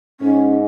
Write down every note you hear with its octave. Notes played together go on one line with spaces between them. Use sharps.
G#2 C#4